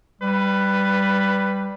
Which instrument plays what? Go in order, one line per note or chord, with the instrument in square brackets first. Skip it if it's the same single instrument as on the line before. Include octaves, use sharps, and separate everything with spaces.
[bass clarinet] G3 [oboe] B4